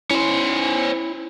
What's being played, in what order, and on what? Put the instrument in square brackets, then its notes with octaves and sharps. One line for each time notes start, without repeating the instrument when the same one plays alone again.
[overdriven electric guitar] C#4 C5 [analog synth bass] E4